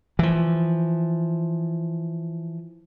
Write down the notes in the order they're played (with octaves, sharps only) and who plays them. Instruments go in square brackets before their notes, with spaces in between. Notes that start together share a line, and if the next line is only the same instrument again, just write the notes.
[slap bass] E3 F3